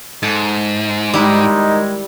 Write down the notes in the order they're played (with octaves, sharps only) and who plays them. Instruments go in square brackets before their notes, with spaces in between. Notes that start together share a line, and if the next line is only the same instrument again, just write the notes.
[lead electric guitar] G#2 [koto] A4
[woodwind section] D#3 G#3 [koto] G3 E4 [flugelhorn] D#4